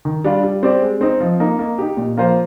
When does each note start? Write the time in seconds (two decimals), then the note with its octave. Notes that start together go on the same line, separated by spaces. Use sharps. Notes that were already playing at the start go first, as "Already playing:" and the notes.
0.05 D#3
0.24 G3 D4 F4
0.43 G3
0.63 C4 G4 D5
0.82 G#3
1.01 C4 D#4
1.20 F3
1.40 A#3 D#4
1.59 A#3
1.78 D#4 G4
1.97 A#2
2.17 F3 A#3 F4 C5